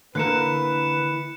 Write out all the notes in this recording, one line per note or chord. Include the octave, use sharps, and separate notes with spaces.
D3 E3 A#3 A#4 B4 F#6 C#7 E7